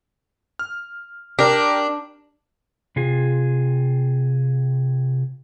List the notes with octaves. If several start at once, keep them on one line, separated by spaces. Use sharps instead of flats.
F6
D4 G4 A#4
C3 F4 G#4